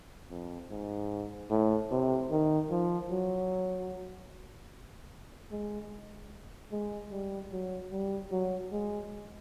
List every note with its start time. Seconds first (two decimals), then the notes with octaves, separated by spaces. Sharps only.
0.30 F2
0.70 G#2
1.50 A2
1.91 C3
2.31 D#3
2.70 F3
3.11 F#3
5.51 G#3
6.71 G#3
7.11 G3
7.52 F#3
7.92 G3
8.32 F#3
8.72 G#3